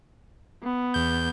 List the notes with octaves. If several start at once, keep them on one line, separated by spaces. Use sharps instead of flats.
B3
E2 G6